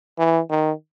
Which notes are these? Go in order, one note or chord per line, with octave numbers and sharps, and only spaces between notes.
E3
D#3